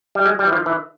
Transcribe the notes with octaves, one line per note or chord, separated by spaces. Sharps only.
G3
G#3
G3
E3
F3
E3